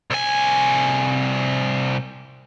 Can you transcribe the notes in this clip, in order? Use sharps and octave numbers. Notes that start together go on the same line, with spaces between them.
C2 G#5